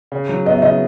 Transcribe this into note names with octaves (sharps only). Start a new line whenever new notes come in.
C#3
F#3
B3 D#5
E5
C#3 D#5